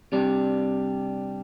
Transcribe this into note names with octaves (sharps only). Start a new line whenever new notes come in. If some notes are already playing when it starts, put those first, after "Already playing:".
C3 G3 D4